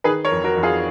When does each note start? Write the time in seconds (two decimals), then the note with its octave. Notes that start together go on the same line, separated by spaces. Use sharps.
0.04 D#3 G#4 B4
0.25 A#4 C#5
0.31 F2
0.44 F#4 A#4
0.57 F2
0.63 F4 G#4